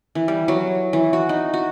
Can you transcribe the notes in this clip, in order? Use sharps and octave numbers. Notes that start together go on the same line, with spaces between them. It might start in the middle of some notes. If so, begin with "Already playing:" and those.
E3
G3
F#3
E3
F#4
D#4
F#4